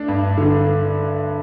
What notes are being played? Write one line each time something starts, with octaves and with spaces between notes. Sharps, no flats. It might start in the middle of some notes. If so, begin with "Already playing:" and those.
Already playing: A3 D4
G2
D3